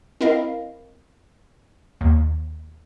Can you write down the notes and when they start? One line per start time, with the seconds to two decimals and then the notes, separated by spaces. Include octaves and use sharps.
0.21 C4 E4 A#4 D#5 F5
2.01 D#2